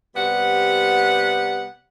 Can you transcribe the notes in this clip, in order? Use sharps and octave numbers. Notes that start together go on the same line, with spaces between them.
C3 G3 B3 F#5